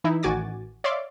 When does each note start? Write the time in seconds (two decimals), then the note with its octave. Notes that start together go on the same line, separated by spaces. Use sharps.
0.04 E3 D#4 E4
0.23 A1 D#3 F#4 G#5 D6 A6
0.84 C#5 D5 E5 F5 C6 D6